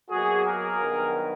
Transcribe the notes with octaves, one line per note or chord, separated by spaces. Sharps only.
B2 F#3 A#3 F#4 G#4
G#4 A#4
G2 D#3 F#3 B3